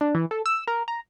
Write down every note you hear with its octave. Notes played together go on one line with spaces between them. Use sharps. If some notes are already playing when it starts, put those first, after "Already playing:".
D4
E3
A4
E6
A#4
A#5